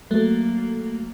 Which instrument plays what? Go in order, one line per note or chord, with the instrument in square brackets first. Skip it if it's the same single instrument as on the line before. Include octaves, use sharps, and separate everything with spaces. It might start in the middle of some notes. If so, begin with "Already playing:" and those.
[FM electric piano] F#3 A3 [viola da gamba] A#3